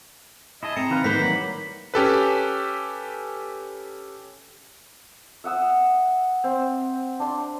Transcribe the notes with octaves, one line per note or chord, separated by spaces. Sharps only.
E4 G#4 D#5 A5
C4 A#5 C#7
D#3 B4 F5
D#3 E3 F#3 G3 A#3 B4 C5 B6
B5
C#4 G4 A4 B4
E5 F#5 D#6 E6
C4
D4 C6